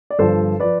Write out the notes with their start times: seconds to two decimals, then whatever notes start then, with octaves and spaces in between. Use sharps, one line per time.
0.10 D5
0.19 G1 G2 F3 A4 C5
0.60 F3 B4 D5